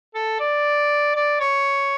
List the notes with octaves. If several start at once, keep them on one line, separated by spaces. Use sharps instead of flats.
A4
D5
D5
C#5